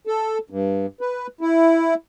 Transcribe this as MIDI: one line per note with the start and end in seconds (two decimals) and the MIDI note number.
0.07 0.38 69
0.50 0.86 43
1.01 1.27 71
1.41 1.94 64